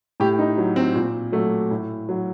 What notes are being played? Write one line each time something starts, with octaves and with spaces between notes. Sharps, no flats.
A2 G4
D#4
F#3
C4
A#2
F#3 A3
A2
F#3